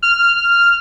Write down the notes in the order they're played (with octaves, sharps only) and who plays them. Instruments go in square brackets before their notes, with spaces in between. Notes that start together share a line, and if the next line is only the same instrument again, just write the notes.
[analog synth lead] F6